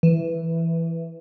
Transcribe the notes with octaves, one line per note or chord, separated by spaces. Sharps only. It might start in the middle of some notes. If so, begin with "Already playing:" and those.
E3